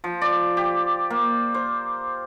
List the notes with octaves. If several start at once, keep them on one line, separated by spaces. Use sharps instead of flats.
F3
D5
G4
A#3
C5